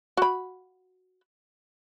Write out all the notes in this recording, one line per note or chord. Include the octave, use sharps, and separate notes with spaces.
F#4 B5